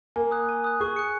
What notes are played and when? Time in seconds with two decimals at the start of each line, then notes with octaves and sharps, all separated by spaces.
0.16 A#3 G#5
0.31 D#6 F#6
0.49 G#5
0.64 D#6 F#6
0.80 G#4 C#6
0.96 F#6 C#7